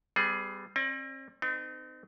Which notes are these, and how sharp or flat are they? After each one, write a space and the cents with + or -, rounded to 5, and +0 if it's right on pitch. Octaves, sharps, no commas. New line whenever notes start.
G3 +0 B3 +40 G#4 +20
C4 +45 D5 +25
C4 -40 D#4 -25 A4 +35